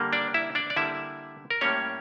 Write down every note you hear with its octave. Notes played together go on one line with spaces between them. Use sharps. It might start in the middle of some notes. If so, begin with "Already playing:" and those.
Already playing: D3 G3 A#3
D4 D5
E4 E5
D4 D5
D5
D3 G3 A#3 E4 E5
A#4
A2 G3 A#3 C#4 C#5